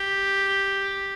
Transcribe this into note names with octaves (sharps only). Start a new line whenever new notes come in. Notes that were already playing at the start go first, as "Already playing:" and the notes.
Already playing: G4